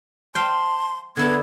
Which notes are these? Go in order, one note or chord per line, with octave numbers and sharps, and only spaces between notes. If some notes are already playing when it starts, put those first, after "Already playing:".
C5 F5 G5 A5 C6
D3 B3 E4 A4 G#6